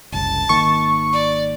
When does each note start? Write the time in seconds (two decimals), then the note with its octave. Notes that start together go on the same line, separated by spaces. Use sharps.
0.12 F#1 C2 F#2 A5
0.49 G#1 D#3 A#3 C#6
1.13 D5